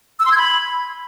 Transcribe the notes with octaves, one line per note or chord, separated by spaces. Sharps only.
E6
C6
G#6
B5